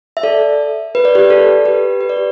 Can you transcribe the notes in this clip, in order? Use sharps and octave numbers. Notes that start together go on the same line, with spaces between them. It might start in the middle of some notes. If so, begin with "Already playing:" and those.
E5
A4 D5
B4
D5
G4 B4
A4 D5
G4 B4
B4
D5
G4